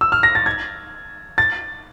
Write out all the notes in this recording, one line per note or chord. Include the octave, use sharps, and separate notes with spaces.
E6
F6
A#6
A6
G#6
A6